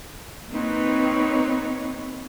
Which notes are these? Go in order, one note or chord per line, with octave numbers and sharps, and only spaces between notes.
A#3 C4 D#4 B4 C#5